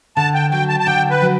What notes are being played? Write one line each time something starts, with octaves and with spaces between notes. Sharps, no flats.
D3 A5
G5
F#3 G5
A5
A5
D3 G5
B4
F#3